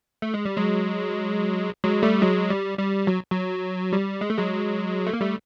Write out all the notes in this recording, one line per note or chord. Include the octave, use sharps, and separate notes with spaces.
A3
G#3
G3
F#3 G#3
F#3 G#3
G3 A3
F#3 G#3
G3
G3
F#3
F#3
G3
G#3
A3
F#3 G#3
A3
A#3
G3 A3